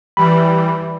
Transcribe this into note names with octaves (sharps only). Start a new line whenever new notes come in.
E3 G3 B5